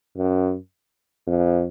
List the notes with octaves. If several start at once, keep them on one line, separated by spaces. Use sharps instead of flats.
F#2
F2